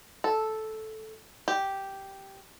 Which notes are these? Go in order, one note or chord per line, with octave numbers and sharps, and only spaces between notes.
A4
G4